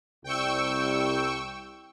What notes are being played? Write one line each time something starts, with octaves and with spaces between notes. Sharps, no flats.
C2 G5 C#6 E6